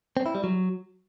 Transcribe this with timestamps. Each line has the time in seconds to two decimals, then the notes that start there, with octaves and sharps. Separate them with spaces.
0.17 C4
0.26 E4
0.35 G3
0.44 F#3